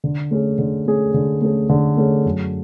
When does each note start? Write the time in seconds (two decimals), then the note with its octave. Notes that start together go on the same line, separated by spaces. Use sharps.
0.04 D3
0.31 A3 C#4 G#4
0.59 D3
0.87 A3 C#4 G#4
1.14 D3
1.41 A3 C#4 G#4
1.69 D3
1.97 A3 C#4 G#4
2.26 F#2